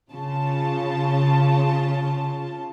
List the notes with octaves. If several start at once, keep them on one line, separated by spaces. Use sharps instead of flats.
C#3 F4 A5